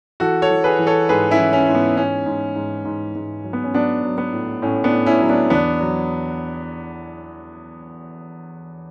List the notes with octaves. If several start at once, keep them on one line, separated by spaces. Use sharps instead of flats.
E3 F#4 A4
A4 C#5
E3
G#4 B4
E3
A4 C#5
G#2 G#4 B4
C#4 E4
E3
C#4
G#2
B3
G#2 C#4
G#2
G#2
G#2
G#2
F#3
B3
C#4
F#3 B3 D4
F#3
B3
A2
A2 C#4
B3 D4
A2
C#4 E4
F#3
B3 D4
E2 B3 D4
F#3